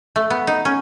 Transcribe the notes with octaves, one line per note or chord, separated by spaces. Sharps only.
A3
B3
D#4
C#4